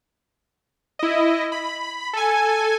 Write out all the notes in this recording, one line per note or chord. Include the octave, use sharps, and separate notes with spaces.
E4 D#5
B5
A4 G#5